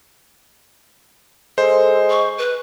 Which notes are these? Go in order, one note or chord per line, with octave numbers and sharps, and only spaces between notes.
G#3 A4 C5
C#6
B4